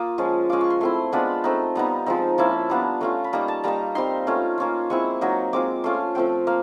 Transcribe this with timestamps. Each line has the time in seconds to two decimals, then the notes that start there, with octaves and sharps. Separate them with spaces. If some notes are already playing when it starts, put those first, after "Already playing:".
Already playing: A#3 F4 D#6
0.18 F3 G#3 C#4
0.49 G#3 C#4 F4 D6
0.61 C#6
0.70 C6
0.81 A3 C4 E4 C6
1.12 G#3 B3 D4 F4 B5
1.44 A3 C4 D#4
1.75 G3 B3 D#4 A#5
2.06 F3 G#3 C4 D#4
2.38 F3 A#3 C#4 E4 A5
2.70 G3 B3 D4 F4 A#5
3.01 A3 C#4 F4 A#5
3.24 B5
3.33 G3 A#3 D#4 A#5
3.48 A5
3.64 G3 A#3 D#4 A#5
3.95 G3 C4 D#4 C6
4.27 A3 C#4 F4
4.58 A#3 C#4 F4
4.90 G#3 C4 E4 C#6
5.21 F#3 A#3 D#4
5.53 G#3 C4 F4 D6
5.84 A3 C#4 F4 C6
6.15 F3 A3 C4 G5
6.47 A#3 F5